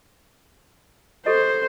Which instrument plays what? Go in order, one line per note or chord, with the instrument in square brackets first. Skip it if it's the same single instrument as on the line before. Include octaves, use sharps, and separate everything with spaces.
[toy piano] G4 A4 D#5 [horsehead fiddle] C5